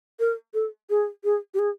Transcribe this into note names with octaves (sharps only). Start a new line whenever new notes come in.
A#4
A4
G#4
G#4
G4
G#4